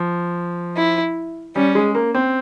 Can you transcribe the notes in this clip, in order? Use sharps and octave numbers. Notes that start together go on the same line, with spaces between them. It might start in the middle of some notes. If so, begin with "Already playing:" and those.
Already playing: F3
E4
G3 C#4
G#3
A#3
C4